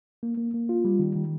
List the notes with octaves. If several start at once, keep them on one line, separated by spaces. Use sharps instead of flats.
A#3
A#3
A#3
F4
G3
D#3
D#3